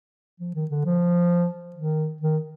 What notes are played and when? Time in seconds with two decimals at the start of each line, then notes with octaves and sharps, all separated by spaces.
0.40 F3
0.55 D#3
0.71 D3
0.85 F3
1.76 D#3
2.21 D#3